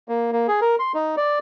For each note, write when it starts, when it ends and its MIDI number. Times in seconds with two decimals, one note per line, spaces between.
0.09 0.32 58
0.32 0.47 58
0.48 0.60 68
0.61 0.76 70
0.79 0.92 84
0.94 1.15 63
1.17 1.39 74